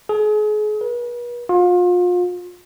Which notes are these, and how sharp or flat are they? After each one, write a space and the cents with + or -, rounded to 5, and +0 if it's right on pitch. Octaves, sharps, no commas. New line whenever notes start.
G#4 +35
B4 -40
F4 +35